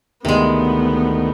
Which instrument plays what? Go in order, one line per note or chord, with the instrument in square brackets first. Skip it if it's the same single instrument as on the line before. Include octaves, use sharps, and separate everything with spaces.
[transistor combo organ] D2 D#3 [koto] C3 G#3 [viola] B3